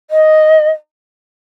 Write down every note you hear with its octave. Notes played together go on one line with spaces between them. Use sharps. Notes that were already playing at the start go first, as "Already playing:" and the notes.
D#5